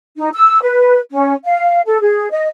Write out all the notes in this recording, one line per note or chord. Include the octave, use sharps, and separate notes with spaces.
D#4
E6
B4
C#4
F5
A4
G#4
D#5